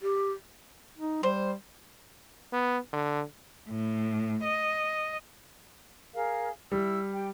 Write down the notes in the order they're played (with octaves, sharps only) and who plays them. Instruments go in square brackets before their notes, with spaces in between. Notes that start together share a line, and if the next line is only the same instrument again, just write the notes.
[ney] G4
[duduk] D#4
[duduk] G3 [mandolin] C5
[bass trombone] B3
D3
[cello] A2
D#5
[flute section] G#4 A#4 F5
[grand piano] G3 [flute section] E4 E6
[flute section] G4 G5